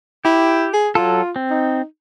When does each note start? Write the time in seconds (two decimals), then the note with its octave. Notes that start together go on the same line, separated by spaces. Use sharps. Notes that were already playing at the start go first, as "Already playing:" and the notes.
0.25 E4 G4
0.73 G#4
0.95 F#3 F4 A4
1.36 C4
1.50 D#4